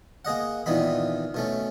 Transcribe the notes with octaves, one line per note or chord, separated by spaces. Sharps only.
A#3 G#4 D#5 F#5
A#2 D#3 E3 B3 D#4 B5
B2 A3 C#4